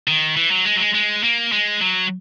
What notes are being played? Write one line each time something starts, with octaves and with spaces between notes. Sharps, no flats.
D#3
E3
F#3
G#3
F#3
G#3
G#3
A#3
G#3
F#3